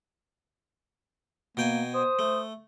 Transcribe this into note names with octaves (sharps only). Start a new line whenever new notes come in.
B2 A#3 G5 G#5
C5 D#6
A3